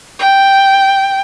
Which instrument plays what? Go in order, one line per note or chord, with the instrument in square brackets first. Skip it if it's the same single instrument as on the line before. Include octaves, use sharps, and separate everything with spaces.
[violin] G5